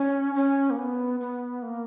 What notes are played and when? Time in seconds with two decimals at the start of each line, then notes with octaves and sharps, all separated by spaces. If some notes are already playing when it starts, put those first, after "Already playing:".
Already playing: C#4
0.35 C#4
0.70 A#3
0.77 B3
1.20 B3
1.62 A#3